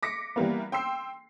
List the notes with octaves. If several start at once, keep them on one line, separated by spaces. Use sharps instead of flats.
D6 A#6 B6 C#7
E3 G3 A#3 B3
G5 C6 E6 C7